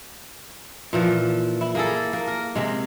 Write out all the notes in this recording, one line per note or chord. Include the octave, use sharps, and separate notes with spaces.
A#2 E3 F3
E4
A#3 G#4 A4
A#3
A#4
C3 G#3